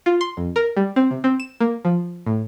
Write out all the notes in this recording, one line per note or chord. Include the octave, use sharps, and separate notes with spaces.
F4
C6
F2
A#4
G3
C4
C3
C4
E7
A#3
F3
A2